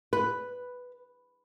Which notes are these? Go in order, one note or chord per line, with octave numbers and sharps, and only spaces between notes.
B4